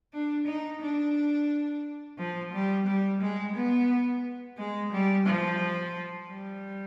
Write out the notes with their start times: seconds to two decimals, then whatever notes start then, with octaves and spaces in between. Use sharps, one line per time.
0.13 D4
0.47 D#4
0.82 D4
2.18 F3
2.53 G3
2.87 G3
3.21 G#3
3.55 B3
4.58 G#3
4.92 G3
5.26 F3
6.28 G3